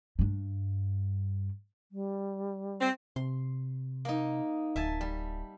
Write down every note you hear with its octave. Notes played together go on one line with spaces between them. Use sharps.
G2 D4
G3
C4
C3 C6
A#3 D#4
D1 E5 G#5 A5
G3